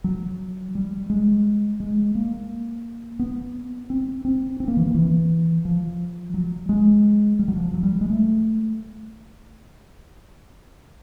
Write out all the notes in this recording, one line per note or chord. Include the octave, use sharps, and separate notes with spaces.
F#3
G3
G#3
G#3
A#3
B3
C4
C4
C4
A#3
E3
D#3
E3
F3
F#3
G#3
G3
F#3
F3
F#3
G3
G#3
A3